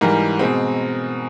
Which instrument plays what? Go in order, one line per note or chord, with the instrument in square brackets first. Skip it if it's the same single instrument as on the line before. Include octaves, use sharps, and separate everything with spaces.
[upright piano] G#2 E3 G3 A#4
B2 G#3 C4